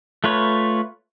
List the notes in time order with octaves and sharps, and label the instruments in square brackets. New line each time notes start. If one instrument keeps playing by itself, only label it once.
[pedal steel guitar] A3 F4 B4 C#5